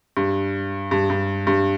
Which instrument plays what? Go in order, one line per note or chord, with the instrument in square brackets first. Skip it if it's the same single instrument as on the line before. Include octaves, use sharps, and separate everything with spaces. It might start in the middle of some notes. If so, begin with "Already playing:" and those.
[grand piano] G2
G2
G2
G2